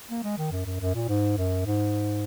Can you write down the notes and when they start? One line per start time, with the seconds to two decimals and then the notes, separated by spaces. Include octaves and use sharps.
0.09 A#3
0.23 G#3
0.38 D#3
0.52 F#2
0.65 F#2
0.80 F#2
0.94 A#2
1.09 G#2
1.37 F#2
1.66 G#2